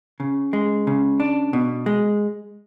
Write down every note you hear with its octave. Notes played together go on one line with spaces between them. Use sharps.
C#3
G#3
C#3
D4
B2
G#3